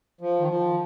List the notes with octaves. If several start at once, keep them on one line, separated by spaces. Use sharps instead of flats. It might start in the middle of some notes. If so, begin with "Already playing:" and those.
F3
D#3
F3